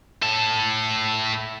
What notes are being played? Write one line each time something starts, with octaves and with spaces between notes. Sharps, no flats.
A2 A4